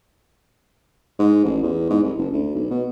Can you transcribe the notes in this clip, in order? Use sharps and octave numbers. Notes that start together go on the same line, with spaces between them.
G#2
A1
E2
G#2
C2
F#1
D2
B1
B2